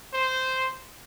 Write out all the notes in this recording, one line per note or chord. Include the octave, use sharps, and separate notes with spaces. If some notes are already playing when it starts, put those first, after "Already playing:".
C5